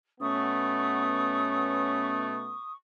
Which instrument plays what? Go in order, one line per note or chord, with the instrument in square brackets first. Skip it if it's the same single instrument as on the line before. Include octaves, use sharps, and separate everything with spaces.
[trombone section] B2 A3 B3 [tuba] C#4 [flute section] C#6 D#6